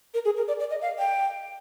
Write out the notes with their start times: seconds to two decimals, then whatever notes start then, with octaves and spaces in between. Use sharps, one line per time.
0.14 A#4
0.25 G#4
0.37 A#4
0.48 D5
0.60 D5
0.70 D#5
0.82 F5
0.99 G5